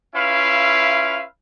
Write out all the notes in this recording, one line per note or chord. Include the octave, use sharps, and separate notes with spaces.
C#4 E4 F4 B4 E5 F5